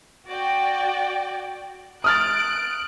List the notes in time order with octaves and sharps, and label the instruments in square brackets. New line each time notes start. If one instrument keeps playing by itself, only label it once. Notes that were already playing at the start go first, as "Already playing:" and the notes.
[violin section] F#4 D5 G5
[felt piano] D#6 F6 A6 [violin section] F#6 D7